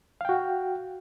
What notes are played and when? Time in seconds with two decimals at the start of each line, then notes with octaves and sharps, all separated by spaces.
0.21 F5
0.25 G5
0.29 F#4